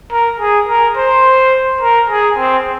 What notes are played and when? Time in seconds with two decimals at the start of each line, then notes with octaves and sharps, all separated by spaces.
0.12 A#4
0.40 G#4
0.68 A#4
0.97 C5
1.81 A#4
2.10 G#4
2.37 C4